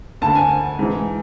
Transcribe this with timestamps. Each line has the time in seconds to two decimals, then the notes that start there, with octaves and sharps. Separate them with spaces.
0.22 D2 D3 A5
0.35 G#5
0.79 G#2 E3